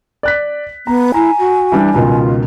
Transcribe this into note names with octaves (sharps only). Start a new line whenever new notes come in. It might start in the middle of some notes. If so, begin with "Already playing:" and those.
D5 F#6 B6
B3 A#5
E4 G#5 A#5
F#4
E3 G3 D4
C#2 B2 D#3 F4